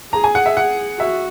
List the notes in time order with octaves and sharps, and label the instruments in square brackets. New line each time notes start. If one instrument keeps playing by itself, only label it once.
[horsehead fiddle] G#4 [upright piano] A#5
[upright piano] G#5
F#5
E5
F#5
[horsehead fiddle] F#4 [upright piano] E5